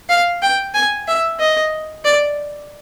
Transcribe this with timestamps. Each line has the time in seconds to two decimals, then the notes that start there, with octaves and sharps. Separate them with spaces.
0.09 F5
0.42 G5
0.74 G#5
1.08 E5
1.40 D#5
2.05 D5